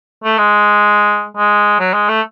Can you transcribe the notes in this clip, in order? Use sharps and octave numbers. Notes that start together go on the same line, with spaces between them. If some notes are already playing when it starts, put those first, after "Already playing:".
A3
G#3
G#3
F#3
G#3
A3